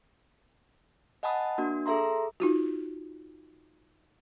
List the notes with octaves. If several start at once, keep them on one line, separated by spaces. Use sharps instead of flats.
D#5 F#5 G#5 A5 B5 D#6
A#3 D4 F#4
G#4 A4 E5 A#5 C6
D#4 F4 F#4